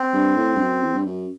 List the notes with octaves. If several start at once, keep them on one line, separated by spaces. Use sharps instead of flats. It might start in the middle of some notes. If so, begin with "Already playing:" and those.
Already playing: C4
G2
A2
G2
F#2
E2
G2
F#2